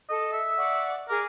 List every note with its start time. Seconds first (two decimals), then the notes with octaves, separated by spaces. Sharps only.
0.09 A4 D#5
0.33 E5
0.56 D5 F#5 C#6
1.09 G#4 A#4 D6